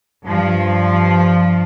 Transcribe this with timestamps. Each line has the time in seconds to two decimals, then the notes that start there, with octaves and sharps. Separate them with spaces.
0.25 G2 F3